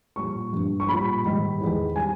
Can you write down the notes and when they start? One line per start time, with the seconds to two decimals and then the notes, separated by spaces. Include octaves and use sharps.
0.16 A#2 G3 C#6
0.53 G2 G3
0.80 C#6
0.88 A#2 G3 B5
1.25 G#2 D#3 G3
1.60 E2 D#3 G#3
1.96 G3 G#5